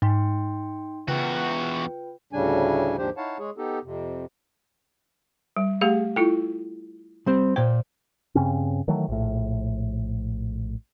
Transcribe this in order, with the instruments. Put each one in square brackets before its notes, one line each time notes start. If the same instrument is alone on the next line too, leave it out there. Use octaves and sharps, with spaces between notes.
[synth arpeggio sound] G#2 [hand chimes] D#4 G5 C6
[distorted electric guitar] E2 F#4 [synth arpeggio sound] C#3 [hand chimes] F4 B4 G5
[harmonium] D2 A2 C#3 G3 D4 G#5
D#2 G#2 F3 D4 G4 C5
D#4 E4 C#5 F5 F#5 A5
G#3 G#4 C#5
B3 D#4 G4 A4
F2 C3
[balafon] G3
[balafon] A3 G4 F5 [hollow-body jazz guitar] G#4
[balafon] E4 F4 A4 [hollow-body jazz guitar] G5
[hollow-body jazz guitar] G3 C4 C5
[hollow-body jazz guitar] A#2 G5 [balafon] C5
[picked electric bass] G2 C#3 C4 C#4
D#3 E3 F#3 A3
A#1 A2